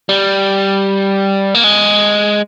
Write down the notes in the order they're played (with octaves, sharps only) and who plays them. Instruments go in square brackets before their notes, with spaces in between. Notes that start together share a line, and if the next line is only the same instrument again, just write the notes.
[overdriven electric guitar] G3
A#3
G#3